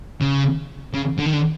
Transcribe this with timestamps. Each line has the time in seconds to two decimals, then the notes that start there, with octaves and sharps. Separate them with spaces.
0.21 C#3
0.93 C#3
1.18 D3
1.26 D#3
1.33 D3